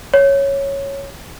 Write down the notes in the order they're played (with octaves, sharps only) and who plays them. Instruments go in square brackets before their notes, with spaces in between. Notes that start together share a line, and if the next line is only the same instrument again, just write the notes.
[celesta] C#5